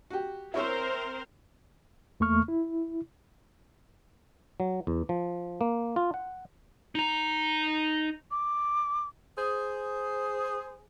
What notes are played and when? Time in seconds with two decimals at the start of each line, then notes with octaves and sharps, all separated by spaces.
0.10 F#4 G4
0.54 C4 E4 A#4 C5 C#5 E5
2.20 E2 A3 A#3 C#6 F6
2.48 E4
4.60 F#3
4.87 E2
5.09 F3
5.61 A#3
5.96 F4
6.14 F#5
6.95 D#4 A#5
8.31 D6
9.37 G#4 C5